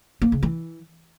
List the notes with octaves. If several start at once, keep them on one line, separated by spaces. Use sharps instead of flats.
A#3
C#3
E3